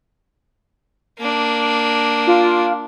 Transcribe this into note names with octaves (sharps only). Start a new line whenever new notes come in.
A#3 D4
F4